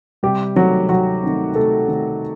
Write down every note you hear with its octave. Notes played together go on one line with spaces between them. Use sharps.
C3 G3 G4
D#3 F#3 A3 C4 F#4
C3 F#3 F#4
D#3 A3 C4
C3 A3 A4
D#3 A3 C4